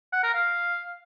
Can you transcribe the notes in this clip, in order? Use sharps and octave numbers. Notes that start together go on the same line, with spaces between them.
F#5
A#4
F5